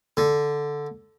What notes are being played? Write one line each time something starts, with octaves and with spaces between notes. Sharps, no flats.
D3